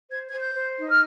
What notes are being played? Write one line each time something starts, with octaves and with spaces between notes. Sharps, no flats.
C5 G#6
C5 G#6
G6
C5
D#4
F6